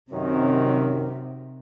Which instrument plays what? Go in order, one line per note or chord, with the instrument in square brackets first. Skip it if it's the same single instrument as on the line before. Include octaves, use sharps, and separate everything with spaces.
[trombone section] F#2 D#3 [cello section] C3